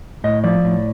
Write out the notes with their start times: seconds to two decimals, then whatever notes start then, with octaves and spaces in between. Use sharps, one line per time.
0.24 A2 D#5
0.44 F3 D5
0.64 A2